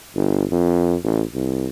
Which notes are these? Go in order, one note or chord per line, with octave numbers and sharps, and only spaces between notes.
G1
F2
A1
C2